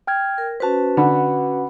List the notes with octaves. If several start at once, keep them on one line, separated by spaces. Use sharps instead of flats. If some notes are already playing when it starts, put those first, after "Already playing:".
G5 F6 G#6
A#4
C#4 F#4 B4 C5 A5
D3 F#5 B5